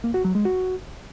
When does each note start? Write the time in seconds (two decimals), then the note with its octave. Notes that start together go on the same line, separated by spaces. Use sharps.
0.04 A#3
0.14 F#4
0.25 F#3
0.35 G#3
0.45 F#4